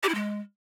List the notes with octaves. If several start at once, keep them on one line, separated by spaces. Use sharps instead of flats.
G4
E4
G#3